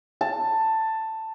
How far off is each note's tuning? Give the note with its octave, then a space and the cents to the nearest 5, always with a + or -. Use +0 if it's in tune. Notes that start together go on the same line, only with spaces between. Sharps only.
A5 +10